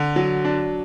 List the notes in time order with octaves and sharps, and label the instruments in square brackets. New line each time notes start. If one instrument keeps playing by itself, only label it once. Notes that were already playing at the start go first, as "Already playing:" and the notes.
Already playing: [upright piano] D3
F#3
D4